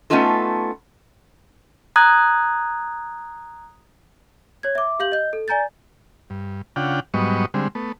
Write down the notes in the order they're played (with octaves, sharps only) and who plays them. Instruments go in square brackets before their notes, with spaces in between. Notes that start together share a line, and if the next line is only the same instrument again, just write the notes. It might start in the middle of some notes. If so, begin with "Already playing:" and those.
[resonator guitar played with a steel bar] A3 B3 C#4 D#4 F4 A4
[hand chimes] A#5 D#6 F#6 G#6
[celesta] C#5 G#6
E5 D6
G4 F5 G6 F#7
D#5 G6
A4
D5 G#5 A#5 G6 A6
[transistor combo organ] G2
C#3 D4 F4 F#5 G5
G#2 F#3 G3 B3 D#5 C#6
D3 G3 G#3 C4
A3 B3